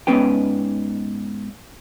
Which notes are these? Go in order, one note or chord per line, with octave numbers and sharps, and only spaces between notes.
G#2 B3 C#4 B4 G5